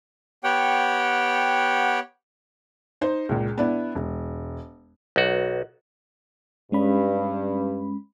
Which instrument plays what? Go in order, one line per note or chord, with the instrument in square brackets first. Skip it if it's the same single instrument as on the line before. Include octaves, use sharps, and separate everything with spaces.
[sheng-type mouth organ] B3 G4 C#5 F#5 G5
[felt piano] D#4 C5
C#2 A#2
B3 D4 E4
E1
[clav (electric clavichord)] B1 F#4
[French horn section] G2 [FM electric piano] G#3 C#4 B5